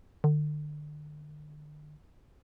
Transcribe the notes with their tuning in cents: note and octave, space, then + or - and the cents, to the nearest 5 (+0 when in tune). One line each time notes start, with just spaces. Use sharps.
D3 +35